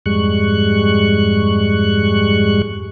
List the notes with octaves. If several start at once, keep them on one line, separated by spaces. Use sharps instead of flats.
F2 G#2 G3 G#3 C#6 F#6